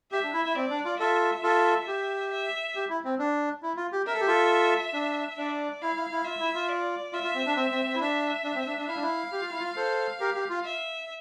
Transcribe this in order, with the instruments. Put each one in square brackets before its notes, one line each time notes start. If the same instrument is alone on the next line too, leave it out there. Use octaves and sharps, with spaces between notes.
[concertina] G4 [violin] E5
[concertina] D4
E4
E4
[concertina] C4 [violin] D5
[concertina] D4
F4
[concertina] F4 A4 [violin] E5
[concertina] F4 A4
G4
[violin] E5
[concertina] G4
E4
C4
D4
E4
F4
G4
[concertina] A#4 [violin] E5
[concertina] A4
G4
F4 A4
D4
[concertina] D4 [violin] D5
[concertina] E4 [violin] F5
[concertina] E4
E4
[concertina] F4 [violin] E5
[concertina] E4
F4
[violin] D5
[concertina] F4 [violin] E5
[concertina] F4
C4
D4
C4
C4
C4
E4
[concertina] D4 [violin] E5
[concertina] D4
C4
D4
D4
[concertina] E4 [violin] F5
[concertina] D4
E4
G4
F4
E4
F4
A4 C5
G4 A#4
G4
F4
[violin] E5